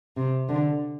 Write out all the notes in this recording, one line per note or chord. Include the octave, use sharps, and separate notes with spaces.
C3
D3